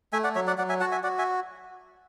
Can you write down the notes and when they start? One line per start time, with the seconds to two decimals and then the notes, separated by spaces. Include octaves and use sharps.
0.13 A3 E5 G#5
0.24 D5 F#5
0.35 F#3 C#5 E5
0.47 D5 F#5
0.58 F#3 D5 F#5
0.69 E5 G#5
0.80 F#4 F#5 A5
0.92 E5 G#5
1.03 F#4 D5 F#5
1.18 E5 G#5